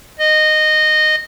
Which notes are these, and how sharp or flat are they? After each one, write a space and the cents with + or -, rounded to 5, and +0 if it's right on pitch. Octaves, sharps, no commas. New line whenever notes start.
D#5 -15